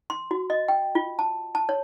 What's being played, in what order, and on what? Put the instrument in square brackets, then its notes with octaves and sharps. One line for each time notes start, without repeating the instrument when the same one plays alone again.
[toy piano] C6
F#4
D#5
G5
F4
A5
A5
C#5